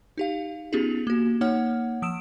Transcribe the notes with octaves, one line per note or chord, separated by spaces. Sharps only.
D#4 G4 F5
B3 C#4 D#4 F4 G4 G#4
A#3 F#4
A#3 D#4 C#5 F#5 F6
F3 D#6 E6 D7 E7